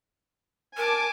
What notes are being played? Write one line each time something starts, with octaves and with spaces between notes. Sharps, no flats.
A#4 G#5 A5 D6